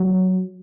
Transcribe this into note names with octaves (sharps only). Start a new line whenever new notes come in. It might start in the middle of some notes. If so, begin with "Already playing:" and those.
Already playing: F#3